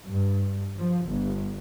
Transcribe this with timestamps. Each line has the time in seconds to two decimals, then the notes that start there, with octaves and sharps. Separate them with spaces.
0.11 G2
0.78 F3
1.07 G1